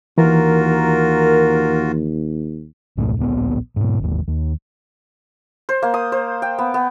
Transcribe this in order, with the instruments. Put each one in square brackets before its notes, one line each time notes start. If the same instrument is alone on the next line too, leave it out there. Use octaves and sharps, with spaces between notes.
[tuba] D#2 [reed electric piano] E3 [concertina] F4 F#4 [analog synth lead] A#4
[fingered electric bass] C2 G2 A#2 A3
D1 A#1 B3
G#2 B2
G1 D#2
D#2
[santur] C5
A#3
D#6
C5
G5
B3
B3